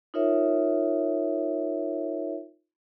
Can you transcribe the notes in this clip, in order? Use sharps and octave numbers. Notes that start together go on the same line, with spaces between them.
D#4 F4 A#4 C#5 E5